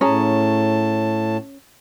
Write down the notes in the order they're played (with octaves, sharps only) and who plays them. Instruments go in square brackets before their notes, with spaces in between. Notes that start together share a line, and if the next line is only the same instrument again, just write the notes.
[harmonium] A2 A5 [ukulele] C#4 G#4 A#5